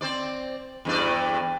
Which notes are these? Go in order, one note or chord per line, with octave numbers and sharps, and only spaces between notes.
C4 C5 D5
E2 G2 D5